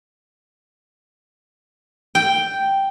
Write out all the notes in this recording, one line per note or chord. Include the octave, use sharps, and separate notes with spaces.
G5